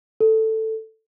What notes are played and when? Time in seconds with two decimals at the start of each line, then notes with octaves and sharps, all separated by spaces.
0.21 A4